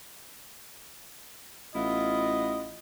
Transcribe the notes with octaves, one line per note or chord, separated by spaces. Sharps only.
A1 B3 E4 F4 D#5